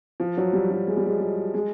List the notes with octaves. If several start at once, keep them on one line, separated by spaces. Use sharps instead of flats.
F3
F#3
G3
F#3
G#3
G3
G#3
G#3
G#3